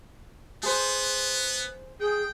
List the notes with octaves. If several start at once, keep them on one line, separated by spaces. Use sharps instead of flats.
B3 G#4 C5
G#4 G5